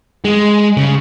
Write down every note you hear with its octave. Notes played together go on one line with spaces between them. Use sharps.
G#3
C#3